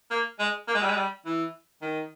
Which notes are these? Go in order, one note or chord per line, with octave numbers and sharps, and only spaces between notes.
A#3
G#3
A#3
G#3
G3
G#3
G3
E3
D#3